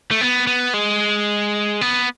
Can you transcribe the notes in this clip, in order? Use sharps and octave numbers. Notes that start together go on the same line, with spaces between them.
A3
B3
B3
G#3
B3